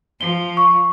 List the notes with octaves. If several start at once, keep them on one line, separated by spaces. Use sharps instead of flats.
F3 G7
C#6